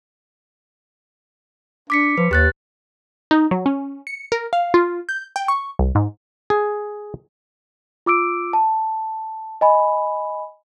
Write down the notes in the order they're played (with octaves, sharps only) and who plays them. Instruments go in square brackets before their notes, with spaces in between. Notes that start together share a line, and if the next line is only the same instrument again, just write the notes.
[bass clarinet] D4 [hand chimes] D6 B6 C#7
[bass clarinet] F3 [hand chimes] B4
[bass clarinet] D#2 [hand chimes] G4 F#6 A6
[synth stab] D#4
F#3
C#4
C#7
A#4
F5
F4
G6
G5
C#6
C2
G#2
[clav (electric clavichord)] G#4
[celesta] F4 D6 E6 D7
A5
D#5 G#5 B5